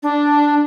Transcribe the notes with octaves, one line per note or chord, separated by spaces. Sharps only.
D4